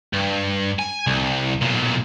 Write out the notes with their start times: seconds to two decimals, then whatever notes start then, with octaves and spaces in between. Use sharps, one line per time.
0.13 G2
0.79 G#5
1.07 C2
1.61 B1 A#2